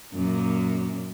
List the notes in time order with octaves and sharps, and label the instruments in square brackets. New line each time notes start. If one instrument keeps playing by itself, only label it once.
[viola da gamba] F#2 A#2 A#3